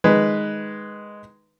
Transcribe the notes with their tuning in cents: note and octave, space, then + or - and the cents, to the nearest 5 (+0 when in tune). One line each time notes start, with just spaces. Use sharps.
D#3 +0 G#3 +0 B4 +0